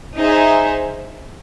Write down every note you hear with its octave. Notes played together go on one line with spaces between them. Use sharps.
D#4 G#4 C5 E5